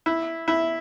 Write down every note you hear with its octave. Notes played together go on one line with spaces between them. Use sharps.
E4
E4